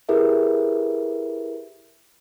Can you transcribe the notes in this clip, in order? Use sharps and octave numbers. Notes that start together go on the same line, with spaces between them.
E4 G4 G#4 A#4 B4 E5